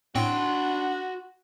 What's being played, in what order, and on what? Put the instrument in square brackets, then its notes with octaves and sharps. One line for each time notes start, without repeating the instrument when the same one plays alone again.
[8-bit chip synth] A2 C4 G5 [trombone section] D4 [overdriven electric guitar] F#4 C6 [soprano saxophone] F#5